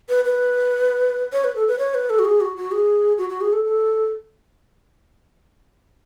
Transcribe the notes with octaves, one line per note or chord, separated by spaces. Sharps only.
B4
B4
C#5
B4
A4
B4
C#5
B4
A4
F#4
G#4
F#4
F#4
G#4
F#4
F#4
G#4
A4
A4